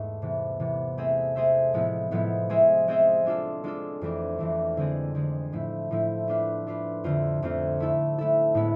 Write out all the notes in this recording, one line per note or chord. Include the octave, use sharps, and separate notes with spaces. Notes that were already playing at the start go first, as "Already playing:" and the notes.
Already playing: E2 G#2 A3
C3 E3 B3
C3 E3 B3
A3 C4 G#4 C5 E5
A3 C4 G#4 C5 E5
A2 F3 G#3 B3 E4
A2 F3 G#3 B3 E4
G#3 C4 G#4 C5 E5
G#3 C4 G#4 C5 E5
G#3 D4 F4 A4
G#3 D4 F4 A4
F2 E3 A3 D4
F2 E3 A3 D4
D3 G#3 C4 G#4
D3 G#3 C4 G#4
A2 F3 A3 E4
A2 F3 A3 E4
A3 D4 F4 B4
A3 D4 F4 B4
F2 D3 A3 C4 F4
F2 D3 A3 C4 F4
A3 E4 A4
A3 E4 A4
A2 G#3 B3 E4